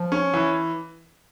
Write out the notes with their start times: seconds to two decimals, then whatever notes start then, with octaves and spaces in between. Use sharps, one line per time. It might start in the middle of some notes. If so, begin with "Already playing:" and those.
Already playing: F3
0.12 C#4
0.34 E3